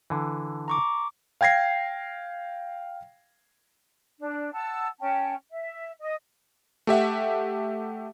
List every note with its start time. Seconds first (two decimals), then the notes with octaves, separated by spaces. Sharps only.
0.10 D3 E3
0.68 A#5 C#6 D6
1.41 F5 G5 G#6 A#6 C7
4.19 D4
4.53 F#5 A5 E6
5.00 C#4 G5 A5
5.50 E5
5.99 D#5
6.87 A3 G4 E5 F#5